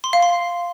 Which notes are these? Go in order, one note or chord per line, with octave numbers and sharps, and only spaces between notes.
C6
F5
C6